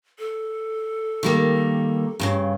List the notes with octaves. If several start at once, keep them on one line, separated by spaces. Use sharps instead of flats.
A4
D#3 G3 A#3
G2 A#2 C#3